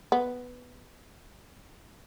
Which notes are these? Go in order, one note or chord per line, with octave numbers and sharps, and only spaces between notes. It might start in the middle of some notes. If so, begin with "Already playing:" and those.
B3